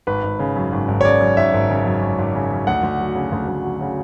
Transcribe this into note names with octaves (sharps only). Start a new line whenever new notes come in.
G#1 B4
G#1
C#3
F#2
G#1
G#1
C#5
C#3 D5
F#2
G#1 E5
G#1
C#3
F#2
G#1
G#1
C#3
F#2
D2 F#5
D2
F#3
C#3
D2
D2
F#3
C#3